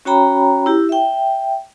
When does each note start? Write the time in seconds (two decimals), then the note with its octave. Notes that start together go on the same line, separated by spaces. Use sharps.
0.05 C#4 F#4 C#5 G5 A#5 B5
0.66 E4 G4
0.89 E5 G5